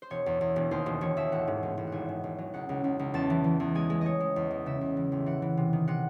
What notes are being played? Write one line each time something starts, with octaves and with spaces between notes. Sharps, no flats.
C5
E1 C#5
E2
E2
E1
D#2 C5
E1
E1 C#5
D#2 E5
A1 F#5
G#2
A1
A1
F#5
G#1 G#5
G#2
G#1
F#3
C#2 F#5
C#2
C#2
C#2
E2 A5
E3
E3
E2
G#3 G#5
G#3
G#3 C#5 D#5
G#3
E2
G#3
C#3 E5
E2
E3
A1
E3 F#5
E3
C3
D#3
C3 F#5